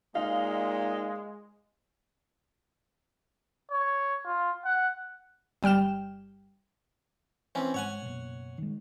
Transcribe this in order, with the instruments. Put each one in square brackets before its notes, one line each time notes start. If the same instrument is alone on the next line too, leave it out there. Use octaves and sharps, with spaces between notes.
[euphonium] A#2 [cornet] G#3 [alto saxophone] D#4 [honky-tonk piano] F5
[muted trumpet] C#5
F4
F#5
[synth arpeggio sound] G1 G3 G5 F6 E7
[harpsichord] E3 C4 C#4
[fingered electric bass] G#1 G#3 [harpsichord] C#5 F#5 G#5
[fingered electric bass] F#1 B2
D#3 G#3